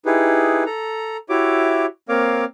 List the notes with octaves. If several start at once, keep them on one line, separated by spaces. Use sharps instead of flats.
D#4 E4 G4 G#4 B4
A4 A#5
E4 F#4 G4 C#5 E5 D6
A#3 C4 A#4 C#5 F5 D6